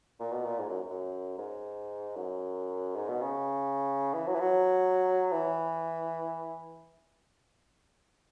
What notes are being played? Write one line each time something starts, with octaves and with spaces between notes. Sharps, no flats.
A#2
B2
A#2
G#2
F#2
F#2
G#2
F#2
G#2
B2
C#3
E3
F#3
E3
F#3
E3